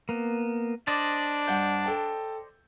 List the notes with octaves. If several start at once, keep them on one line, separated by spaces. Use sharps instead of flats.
A#3 B3
D4 C5 D5 D#5
G2 F#5 G6
A4 G5 A5